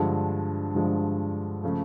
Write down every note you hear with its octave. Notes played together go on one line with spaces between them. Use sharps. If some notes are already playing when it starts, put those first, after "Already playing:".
Already playing: G2 D3 F3 G#3
G2 D3 F3 G#3
C#3 F3 A3